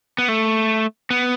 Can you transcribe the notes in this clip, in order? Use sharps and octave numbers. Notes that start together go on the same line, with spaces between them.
B3
A3
B3